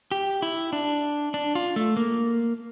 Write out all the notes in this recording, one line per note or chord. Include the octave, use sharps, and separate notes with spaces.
G4
E4
D4
D4
F4
A3
A#3